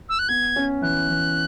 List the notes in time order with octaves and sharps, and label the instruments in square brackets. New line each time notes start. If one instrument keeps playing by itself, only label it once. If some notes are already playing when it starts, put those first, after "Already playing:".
[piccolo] E6
F#6
[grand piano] B3 [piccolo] G#6
[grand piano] C#4
[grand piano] E3 [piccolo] F#6
[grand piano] E3